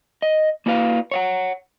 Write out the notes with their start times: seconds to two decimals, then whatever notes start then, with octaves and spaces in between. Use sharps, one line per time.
0.22 D#5
0.66 A#3 D4 E4 F#4 B4 F5
1.11 C#5 F5 F#5